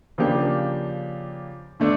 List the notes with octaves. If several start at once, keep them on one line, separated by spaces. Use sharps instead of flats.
C#3 F3 A#3 D4 G4
D3 A3 D4